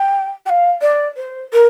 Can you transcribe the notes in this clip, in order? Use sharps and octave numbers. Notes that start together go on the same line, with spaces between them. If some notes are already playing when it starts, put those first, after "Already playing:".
Already playing: G5
G5
F5
D5
C5
A#4